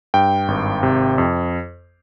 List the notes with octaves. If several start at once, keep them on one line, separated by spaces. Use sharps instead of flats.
G2 G5
G#1
C3
F2